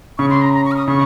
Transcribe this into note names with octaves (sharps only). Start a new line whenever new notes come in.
C#3 C#6
C6
A#5
A#5
C#6
F6
D#6
C#3 C#6